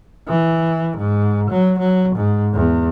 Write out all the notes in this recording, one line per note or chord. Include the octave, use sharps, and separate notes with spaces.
E3
G#2
F#3
F#3
G#2
E2